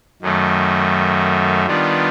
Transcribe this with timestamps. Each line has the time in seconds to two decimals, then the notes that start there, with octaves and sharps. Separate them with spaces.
0.22 F#2 D#3 F#3 A3
1.66 D#3 G3 B3 D4 F4